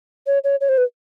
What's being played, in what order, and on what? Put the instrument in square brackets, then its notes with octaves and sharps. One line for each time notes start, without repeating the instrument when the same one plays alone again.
[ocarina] C#5
C#5
C#5
C5
B4